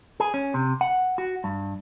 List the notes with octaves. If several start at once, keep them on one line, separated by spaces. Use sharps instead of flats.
G#4
C#4
C3
F#5
F#4
G2